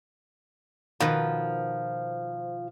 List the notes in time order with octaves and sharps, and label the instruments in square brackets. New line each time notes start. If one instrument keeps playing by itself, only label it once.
[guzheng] B2 D#3 B4 [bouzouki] F3